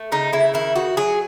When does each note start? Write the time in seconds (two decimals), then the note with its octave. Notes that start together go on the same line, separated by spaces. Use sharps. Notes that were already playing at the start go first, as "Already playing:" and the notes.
Already playing: A3
0.12 C#3 D#4
0.33 C#3 E4
0.54 D#3 E4
0.76 D#3 F#4
0.97 F#3 G#4